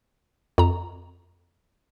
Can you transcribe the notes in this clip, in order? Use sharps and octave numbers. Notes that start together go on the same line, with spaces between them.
F2 A#5